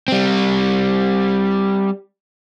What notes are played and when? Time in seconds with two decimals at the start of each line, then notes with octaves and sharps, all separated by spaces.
0.08 G3 C4